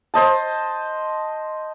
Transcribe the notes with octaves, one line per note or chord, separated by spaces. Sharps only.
C5 D#5 A5